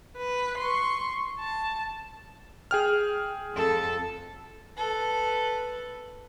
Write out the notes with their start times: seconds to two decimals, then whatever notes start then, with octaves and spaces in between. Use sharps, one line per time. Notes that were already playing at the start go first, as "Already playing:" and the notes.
0.18 B4
0.58 C6 C#6
1.39 A5
2.71 G#4 G5 F6
3.53 F2 A4
4.77 A4 B4